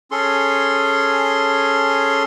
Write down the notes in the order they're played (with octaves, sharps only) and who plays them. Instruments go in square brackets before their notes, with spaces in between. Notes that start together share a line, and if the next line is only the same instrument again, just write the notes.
[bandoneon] C#4 G#4 A4 C6